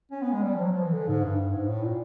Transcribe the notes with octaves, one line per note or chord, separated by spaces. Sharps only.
C#4
B3
G#3
G3
F3
F#3
F3
E3
D3
G#2
G2
G#2
A2
A#2